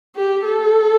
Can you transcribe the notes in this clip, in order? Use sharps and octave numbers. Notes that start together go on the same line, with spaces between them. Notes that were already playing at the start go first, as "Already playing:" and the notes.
G4
A4